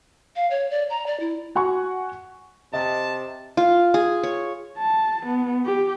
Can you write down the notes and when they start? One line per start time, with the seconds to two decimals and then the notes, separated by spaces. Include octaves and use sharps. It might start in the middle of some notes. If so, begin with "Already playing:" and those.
0.36 F5
0.51 C#5
0.70 D5
0.90 A#5
1.07 D5
1.20 E4
1.55 F#4 F#5 G#5 C#6
2.73 C3 D#5 A5
3.57 F4
3.94 G#4
4.23 C#5
4.78 A5
5.26 B3
5.65 G4